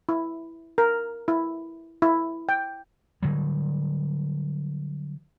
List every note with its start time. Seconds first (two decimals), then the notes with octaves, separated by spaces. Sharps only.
0.09 E4
0.78 A#4
1.28 E4
2.02 E4
2.49 G5
3.23 D3 F#3 G3